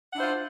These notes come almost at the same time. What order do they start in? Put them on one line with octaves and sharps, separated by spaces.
F#5 D4 E4 C5 F4